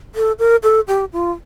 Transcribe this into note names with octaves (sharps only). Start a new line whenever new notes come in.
A4
A#4
A4
G4
F4